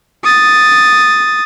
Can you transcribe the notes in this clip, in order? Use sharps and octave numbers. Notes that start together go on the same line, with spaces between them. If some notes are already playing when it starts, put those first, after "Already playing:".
D#6 A6